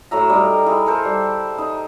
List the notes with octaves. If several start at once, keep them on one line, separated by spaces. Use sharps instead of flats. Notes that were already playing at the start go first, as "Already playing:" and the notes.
A2 F#3 E5 A#5
G3 D#4 A#4
E4 G#4
A4 A#4 C5
G3
D#4